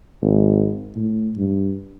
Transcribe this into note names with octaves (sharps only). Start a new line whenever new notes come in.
G#1
A2
G2